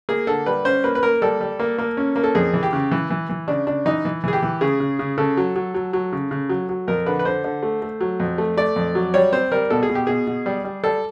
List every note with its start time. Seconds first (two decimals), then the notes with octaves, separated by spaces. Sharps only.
0.09 A#3 G#4
0.27 D3 A4
0.46 G3 B4
0.65 C#4 C5
0.84 A#3 B4
0.95 B4
1.03 A#3 A#4
1.22 G3 A4
1.41 G3
1.59 A#3
1.78 A#3
1.97 C#4
2.16 A#3
2.24 A4
2.35 F2 G#4
2.54 E3
2.63 G4
2.73 C#3
2.91 E3
3.10 E3
3.29 E3
3.48 C#3 D4
3.67 C#3 D4
3.85 E3 D#4
4.05 E3
4.24 E3 G#4
4.33 G4
4.42 E3
4.61 C#3 G#4
4.80 C#3
4.99 C#3
5.18 C#3 A4
5.37 F#3
5.56 F#3
5.74 F#3
5.93 F#3
6.12 C#3
6.31 C#3
6.49 F#3
6.69 F#3
6.88 F2 A#4
7.06 D3 B4
7.19 B4
7.25 D3 C5
7.44 D3
7.63 A3
7.82 A3
8.00 F#3
8.20 F2
8.38 A3
8.57 A3 D5
8.76 F2
8.95 F#3
9.14 G3 C#5
9.33 C4 C5
9.52 G3 A#4
9.70 B2 A4
9.83 G#4
9.89 B2
9.95 G4
10.07 B2 G#4
10.27 B2
10.46 G3
10.64 G3
10.84 G3 A4